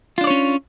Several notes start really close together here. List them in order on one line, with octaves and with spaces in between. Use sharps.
F4 D4 D5 C#5 C#4